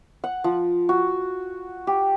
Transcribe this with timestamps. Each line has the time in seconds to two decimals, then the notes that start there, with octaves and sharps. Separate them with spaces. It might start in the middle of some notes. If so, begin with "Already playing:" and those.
0.24 F#5
0.44 F3
0.89 F#4
1.87 G4